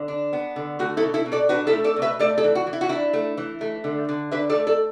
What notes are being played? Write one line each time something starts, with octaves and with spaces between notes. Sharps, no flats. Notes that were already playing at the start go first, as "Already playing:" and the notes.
Already playing: D3
D4
B3
D3
A3 F#4
E4 A4
B2
E4 A4
B2
A4 D5
D4 F#4 B4
E4 A4
A3
A4 D5
B2
B4 E5
A3 A4 D5
A4 D5
E3
F#4
E3
E4
F#4
D4 E4
A3
E3
A3
D3
D3
D4 B4 E5
A4 D5
A3
A4 D5